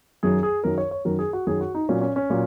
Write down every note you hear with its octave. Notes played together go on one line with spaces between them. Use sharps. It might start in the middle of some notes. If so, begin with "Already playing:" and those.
F#2 D#3 F#3 G#4
G#4
F#2 D#3 F#3 A#4
C#5
C#5
F#2 D#3 F#3 A#4
G#4
F#4
F#2 D#3 F#3 G#4
F#4
D#4
A#2 F#3 C#4
C#4
C#4
A#2 F#3